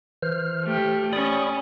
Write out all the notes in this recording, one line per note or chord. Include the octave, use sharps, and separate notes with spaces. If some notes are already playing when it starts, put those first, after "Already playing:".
E3 C5 F6
A3 G4
C#4 D5 B5 D#6